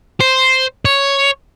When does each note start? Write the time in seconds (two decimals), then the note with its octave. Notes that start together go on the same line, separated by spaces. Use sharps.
0.21 C5
0.85 C#5